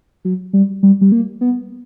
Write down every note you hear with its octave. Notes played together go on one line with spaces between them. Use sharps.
F#3
G3
G3
G3
A#3
B3